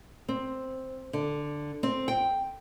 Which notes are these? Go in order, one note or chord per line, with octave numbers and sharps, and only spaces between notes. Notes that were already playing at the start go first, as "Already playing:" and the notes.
C4
D3
C4
G5